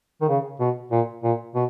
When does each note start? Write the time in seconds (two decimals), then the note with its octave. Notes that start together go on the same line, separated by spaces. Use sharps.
0.21 D#3
0.29 C#3
0.60 B2
0.91 A#2
1.23 A#2
1.55 B2